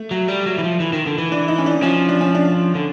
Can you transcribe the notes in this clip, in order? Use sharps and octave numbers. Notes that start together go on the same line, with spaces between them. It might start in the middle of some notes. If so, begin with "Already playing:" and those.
Already playing: A3
F#3
G3
F#3
E3
F3
E3
D#3
D3
E3
D4
D#4
C#4
D4
F3 C#4
D4
C#4
D4
D3